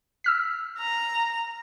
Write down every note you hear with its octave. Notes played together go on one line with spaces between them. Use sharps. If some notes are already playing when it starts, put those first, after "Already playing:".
E6 F6 B6
A#5